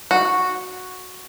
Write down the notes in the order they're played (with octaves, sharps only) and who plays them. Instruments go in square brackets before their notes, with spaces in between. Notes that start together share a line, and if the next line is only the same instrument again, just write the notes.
[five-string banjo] F#4